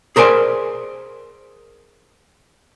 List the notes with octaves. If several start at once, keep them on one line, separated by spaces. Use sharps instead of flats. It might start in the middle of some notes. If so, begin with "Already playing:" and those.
G#4 A#4 C5 D5 G#5